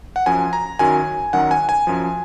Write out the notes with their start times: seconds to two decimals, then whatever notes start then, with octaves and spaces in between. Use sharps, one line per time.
0.16 F#5
0.26 F#2 F3 G#5
0.53 A#5
0.79 F#2 D#3 F#3 G#5
1.33 F#2 D#3 F#3 F#5
1.51 G#5
1.69 G#5
1.87 F#2 F3